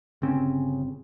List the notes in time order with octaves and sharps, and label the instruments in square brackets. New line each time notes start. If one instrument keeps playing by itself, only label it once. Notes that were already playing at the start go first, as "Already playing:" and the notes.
[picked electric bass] G1 C4 C#4 [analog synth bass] C#3